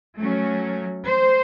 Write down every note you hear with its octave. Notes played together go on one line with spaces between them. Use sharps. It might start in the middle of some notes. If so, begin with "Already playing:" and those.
F#3 A3 C#4
C5